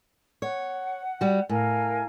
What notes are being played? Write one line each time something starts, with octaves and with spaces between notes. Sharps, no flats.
C#5 F#5
G3 F#4
A2 A#4 F5 G#5